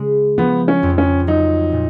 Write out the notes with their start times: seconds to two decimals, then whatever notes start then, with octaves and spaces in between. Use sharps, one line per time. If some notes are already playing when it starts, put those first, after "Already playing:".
Already playing: C#3 G#3
0.38 F3 B3
0.68 C#4
0.83 F2
0.98 C#4
1.27 F#3 D#4
1.72 A#2